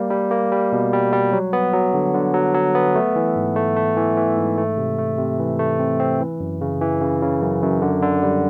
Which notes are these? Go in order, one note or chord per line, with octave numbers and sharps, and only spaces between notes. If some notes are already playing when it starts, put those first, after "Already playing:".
Already playing: G3 A#3
G3
A#3
G3
B2
G3
G3
F#3
B3
F#3
D3
D3
F#3
F#3
B3
A3
E3
G#2
A3
A3
E3
E3
G#2
A3
C3
A3
C3
E3
A3
C4
C4
E3
F#2
C#3
E3
C#3
C#3
F#2
F#2
D3
D3
G3